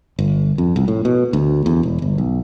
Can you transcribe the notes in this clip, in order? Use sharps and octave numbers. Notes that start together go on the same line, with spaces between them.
G1
F2
C2
A2
B2
D2
E2
E1
G1
B1